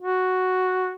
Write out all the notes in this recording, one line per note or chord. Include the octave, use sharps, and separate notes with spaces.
F#4